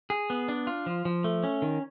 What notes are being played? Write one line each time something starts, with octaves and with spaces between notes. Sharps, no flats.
G#4
B3
D4
F4
F3
F3
A3
C#4
D#3